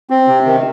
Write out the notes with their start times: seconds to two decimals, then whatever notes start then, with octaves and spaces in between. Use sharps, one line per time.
0.10 C4
0.28 C3
0.46 D#3